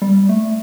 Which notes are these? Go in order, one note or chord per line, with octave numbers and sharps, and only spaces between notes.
G3
A3